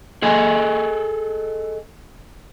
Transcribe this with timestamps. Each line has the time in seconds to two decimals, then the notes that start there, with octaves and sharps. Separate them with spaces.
0.22 G#4 A4 D#5 G#5